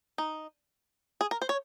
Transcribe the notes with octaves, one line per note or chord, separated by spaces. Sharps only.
D#4
G#4
A#4
C5
C#5